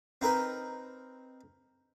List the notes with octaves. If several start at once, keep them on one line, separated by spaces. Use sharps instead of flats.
C4 D#4 A#4 B4